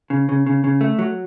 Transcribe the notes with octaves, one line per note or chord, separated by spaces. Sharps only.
C#3
C#3
C#3
C#3
A3
F#3